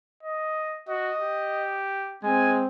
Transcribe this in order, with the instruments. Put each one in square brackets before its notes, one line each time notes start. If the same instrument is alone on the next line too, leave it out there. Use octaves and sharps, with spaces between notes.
[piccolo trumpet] D#5
[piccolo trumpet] F#4 [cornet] D#5
[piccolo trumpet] G4
[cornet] G#3 [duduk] C4 [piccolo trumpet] G#5